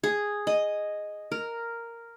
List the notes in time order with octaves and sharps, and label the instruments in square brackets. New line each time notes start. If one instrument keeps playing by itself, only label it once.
[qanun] G#4
D#5
A#4